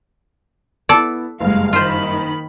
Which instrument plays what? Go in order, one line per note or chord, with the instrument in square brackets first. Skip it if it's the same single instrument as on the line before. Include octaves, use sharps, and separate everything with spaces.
[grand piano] B3 E4 [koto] A4 D5
[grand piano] F#1 G2 [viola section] G#3 F5
[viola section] D#3 B5 [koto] F4 C5